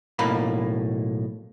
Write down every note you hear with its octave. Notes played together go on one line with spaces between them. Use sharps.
B1 A2 A#3 F5 B5